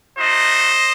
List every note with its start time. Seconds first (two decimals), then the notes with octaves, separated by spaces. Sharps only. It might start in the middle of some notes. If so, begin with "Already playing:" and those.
0.19 A3 D#4 F#4 C5 D#5